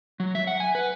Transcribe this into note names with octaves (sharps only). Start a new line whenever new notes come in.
F#3
E5
F#5
G#5
B4